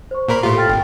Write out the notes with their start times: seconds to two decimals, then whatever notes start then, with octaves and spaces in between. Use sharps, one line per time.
0.11 C5 C#6
0.29 A#2 A#4 B5
0.43 A2 F4 G4 A4 C6
0.57 G5 F6 A6
0.69 G#1 G5